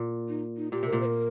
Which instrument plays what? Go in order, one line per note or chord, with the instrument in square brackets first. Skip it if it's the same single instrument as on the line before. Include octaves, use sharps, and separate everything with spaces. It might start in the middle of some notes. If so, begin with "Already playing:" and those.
Already playing: [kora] A#2
[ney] D#4
D#4
[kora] A#2 [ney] G4
[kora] C3 [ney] A#4
[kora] A#2
[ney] C5
A#4